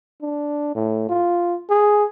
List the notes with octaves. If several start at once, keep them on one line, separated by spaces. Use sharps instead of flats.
D4
A2
F4
G#4